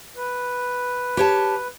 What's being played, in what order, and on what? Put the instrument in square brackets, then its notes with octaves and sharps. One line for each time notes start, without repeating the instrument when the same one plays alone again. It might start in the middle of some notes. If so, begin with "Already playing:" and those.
[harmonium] B4
[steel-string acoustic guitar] G4 C#5 A5